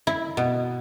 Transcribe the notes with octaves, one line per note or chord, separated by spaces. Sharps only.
E4
B2